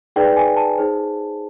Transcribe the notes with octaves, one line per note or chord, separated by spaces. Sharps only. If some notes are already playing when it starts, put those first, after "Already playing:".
D#4 G#4 B4 D5 G5
G#5
A5
D#4 G#4 C5